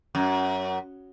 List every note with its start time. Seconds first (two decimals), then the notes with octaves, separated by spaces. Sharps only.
0.15 F#2